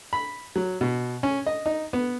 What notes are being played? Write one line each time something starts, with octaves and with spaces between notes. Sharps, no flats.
B5
F#3
B2
C#4
D#5
D#4
B3